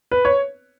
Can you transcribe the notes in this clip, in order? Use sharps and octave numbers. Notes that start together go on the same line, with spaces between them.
B4
C#5